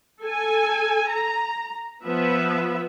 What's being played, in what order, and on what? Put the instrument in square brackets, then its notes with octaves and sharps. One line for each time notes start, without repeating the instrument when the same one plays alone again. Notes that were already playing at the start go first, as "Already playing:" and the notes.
[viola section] A4 G#5
A#5
F3 B3 B4 E5